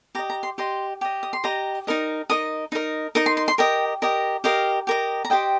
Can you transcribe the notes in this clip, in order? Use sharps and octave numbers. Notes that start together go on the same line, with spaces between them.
G4 D#5 A#5
A#5
C6
G4 D#5 C6
G4 D#5
D#6
C6
G4 D#5 A#5
D#4 A#4 D#5
D#4 A#4 D#5 D#6
D#4 A#4 D#5
D#4 A#4 D#5 D#6
C6
C6
C6
G4 A#4 D#5 G5
G4 A#4 D#5
G4 A#4 D#5 F5
G4 A#4 D#5
A#5
G4 C5 D#5 G5